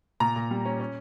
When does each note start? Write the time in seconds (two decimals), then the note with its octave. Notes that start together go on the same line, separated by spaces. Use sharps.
0.20 A#2 A#5
0.36 A#2
0.51 G3
0.65 C#4
0.80 C#4